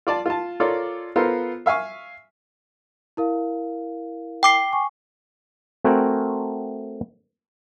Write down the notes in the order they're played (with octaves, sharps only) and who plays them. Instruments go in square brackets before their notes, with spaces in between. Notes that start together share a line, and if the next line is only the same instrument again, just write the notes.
[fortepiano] F4 D5 A5
F4 A5
F4 A4 A#4 C#5 D5
B3 F4 A4 A#4 C5
E5 F5 G#5 C#6
[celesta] E4 A#4 F5
[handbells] G5 D6 C7
[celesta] G#5 C#6
[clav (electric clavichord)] A3 C4 F#4 A#4 G5 G#5